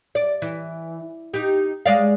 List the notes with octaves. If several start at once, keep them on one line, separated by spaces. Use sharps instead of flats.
D5
E3
D#4 G4
G#3 D5 F5